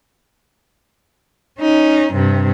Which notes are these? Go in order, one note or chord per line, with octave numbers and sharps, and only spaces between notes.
C#4 D#4
G2 C3